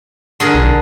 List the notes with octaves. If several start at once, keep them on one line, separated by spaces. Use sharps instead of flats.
D3 G#4 A#4
B1